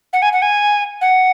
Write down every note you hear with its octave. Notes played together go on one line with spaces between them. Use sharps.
F#5
G#5
F#5
G#5
F#5